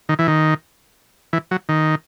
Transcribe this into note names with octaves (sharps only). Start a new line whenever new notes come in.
D#3
E3
D#3
E3
F#3
D#3